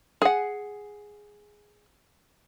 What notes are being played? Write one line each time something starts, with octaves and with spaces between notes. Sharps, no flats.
G#4 F#5